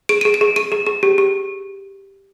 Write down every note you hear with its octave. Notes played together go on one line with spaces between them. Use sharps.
G#4 D7
G#4 D#7
D7
G#4
G#4 D#7
G#4
G#4
G4
G4